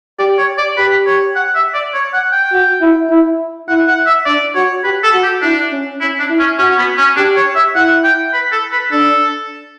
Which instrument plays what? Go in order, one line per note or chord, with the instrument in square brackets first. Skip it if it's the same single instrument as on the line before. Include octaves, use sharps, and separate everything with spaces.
[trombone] G4 [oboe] D5
[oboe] C#5
D5
[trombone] G4 [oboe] B4
[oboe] C#5
F#5
E5
D5
C#5
F#5
G5
[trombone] F#4
E4
E4
[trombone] E4 [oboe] F#5
[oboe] F#5
E5
[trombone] D4 [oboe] D5
[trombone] F#4 [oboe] C#5
[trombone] G4 [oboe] B4
[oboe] A4
[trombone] F#4
[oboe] G4
[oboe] D4 [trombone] E4
[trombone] C#4
[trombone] C#4 [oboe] E4
[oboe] D4
[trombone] E4
[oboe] C#4
[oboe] C#4 [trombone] F#4
[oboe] C#4
B3
C#4
[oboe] D4 [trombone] G4
[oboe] C#5
E5
[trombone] E4 [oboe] F#5
[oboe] G5
B4
A4
B4
[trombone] D4 [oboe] A4